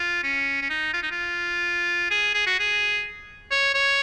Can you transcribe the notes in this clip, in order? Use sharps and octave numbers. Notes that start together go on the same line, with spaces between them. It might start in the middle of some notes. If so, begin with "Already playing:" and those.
Already playing: F4
C#4
C#4
D#4
F4
D#4
F4
G#4
G#4
F#4
G#4
C#5
C#5